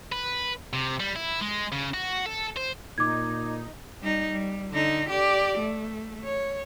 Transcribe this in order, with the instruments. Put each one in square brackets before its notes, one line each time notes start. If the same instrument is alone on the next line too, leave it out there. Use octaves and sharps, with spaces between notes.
[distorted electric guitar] B4
C3
G3
E4
G#3
C#3
F#4
A4
C5
[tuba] A#2 [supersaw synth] D#4 [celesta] D6 G#6
[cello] G3 D#4
G3
D3 D#4
G4 D5
A3
C#5